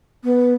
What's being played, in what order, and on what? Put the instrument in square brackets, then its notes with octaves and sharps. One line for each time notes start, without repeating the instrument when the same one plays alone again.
[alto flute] B3